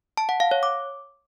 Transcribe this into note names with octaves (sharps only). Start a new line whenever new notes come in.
A5
F#5
F5
C#5
D6